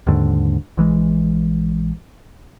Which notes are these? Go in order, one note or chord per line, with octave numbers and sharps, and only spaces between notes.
D#2 G#2 D3
A#1 E3 G#3